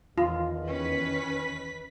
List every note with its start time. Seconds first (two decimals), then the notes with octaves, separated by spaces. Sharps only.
0.18 E2 D#3 F4
0.67 C#4 B4 B6